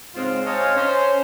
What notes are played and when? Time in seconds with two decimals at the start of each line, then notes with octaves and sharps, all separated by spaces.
0.15 G#2 C#3 G#3 C4 F4
0.45 C5 C#5 D#5 F5 G#5 A5
0.76 C#4 C5